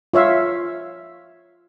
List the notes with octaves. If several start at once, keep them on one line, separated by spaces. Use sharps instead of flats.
F4 C#5 E5 F5